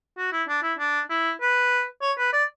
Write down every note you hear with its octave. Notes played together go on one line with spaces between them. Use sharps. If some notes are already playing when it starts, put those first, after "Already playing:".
F#4
E4
D4
E4
D4
E4
B4
C#5
B4
D5